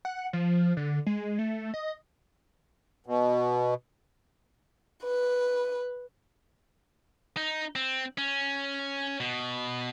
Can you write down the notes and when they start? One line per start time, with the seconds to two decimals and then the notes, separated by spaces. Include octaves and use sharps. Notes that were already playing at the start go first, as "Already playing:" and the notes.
0.05 F#5
0.33 F3
0.77 D3
1.06 G#3
1.39 A3
1.74 D#5
3.06 B2
5.04 B4
7.37 D#4
7.76 C4
8.18 C#4
9.20 B2